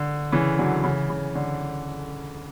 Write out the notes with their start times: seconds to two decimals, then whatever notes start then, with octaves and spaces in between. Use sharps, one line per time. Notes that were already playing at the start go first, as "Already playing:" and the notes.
Already playing: D3
0.32 C#3 E3
0.59 D3 F#3
0.84 C#3 E3
1.10 C#3
1.35 D3